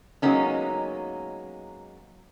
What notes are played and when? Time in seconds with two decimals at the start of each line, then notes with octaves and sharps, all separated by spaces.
0.22 F#3 G#3 A#3 B3 C#4 D#4